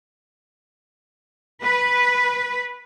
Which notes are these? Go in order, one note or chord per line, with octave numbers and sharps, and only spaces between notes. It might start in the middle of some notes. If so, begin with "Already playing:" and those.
B4